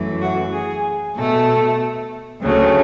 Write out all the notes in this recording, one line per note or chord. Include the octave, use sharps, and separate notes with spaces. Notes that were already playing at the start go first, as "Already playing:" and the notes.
Already playing: F#2 E3 A3
F#4
G#4
B2 A3 A4
D2 C#3 F#3 A3